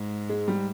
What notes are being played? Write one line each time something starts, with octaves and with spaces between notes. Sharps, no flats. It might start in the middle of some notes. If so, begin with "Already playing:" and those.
Already playing: G#2
G#3
G3